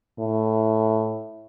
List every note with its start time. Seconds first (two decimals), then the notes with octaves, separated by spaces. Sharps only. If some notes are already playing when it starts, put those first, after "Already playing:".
0.19 A2